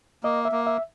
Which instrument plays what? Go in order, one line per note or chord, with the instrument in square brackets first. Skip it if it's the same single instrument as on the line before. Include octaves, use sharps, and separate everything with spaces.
[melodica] A#3 [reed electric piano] D#5
[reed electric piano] E5
[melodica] A#3
[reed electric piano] E5